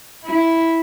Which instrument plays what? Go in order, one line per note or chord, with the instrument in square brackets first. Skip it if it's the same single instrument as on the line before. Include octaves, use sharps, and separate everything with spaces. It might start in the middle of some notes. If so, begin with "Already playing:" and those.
[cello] E4